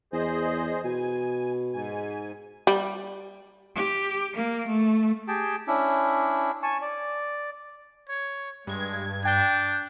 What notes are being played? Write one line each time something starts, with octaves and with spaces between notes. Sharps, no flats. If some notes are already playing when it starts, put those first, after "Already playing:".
E2 G#4 C5 D#5
B2 G#5
G#2 G#5
G3
G4
A#3
A3
G4 G#4 G5 A5
C#4 D4 E4
G#5 A5 C#6
D5
C#5
G2 G#3 G#6
D4 G5 G6